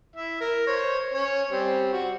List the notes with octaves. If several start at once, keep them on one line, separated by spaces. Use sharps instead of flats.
E4 E5
A#4
C5 C#5
C#4 C#5
G3 C4
F#4